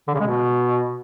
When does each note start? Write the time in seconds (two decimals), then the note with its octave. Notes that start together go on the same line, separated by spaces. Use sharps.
0.08 D3
0.14 C#3
0.20 G#3
0.27 B2